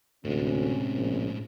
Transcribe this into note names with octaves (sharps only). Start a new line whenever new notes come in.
D2 A2 C3 G#3 C#4
A#1